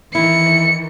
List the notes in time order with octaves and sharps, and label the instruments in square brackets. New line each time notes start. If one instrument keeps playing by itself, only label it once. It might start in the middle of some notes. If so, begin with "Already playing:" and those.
[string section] D#3 E3 [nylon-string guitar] E4 [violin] C#7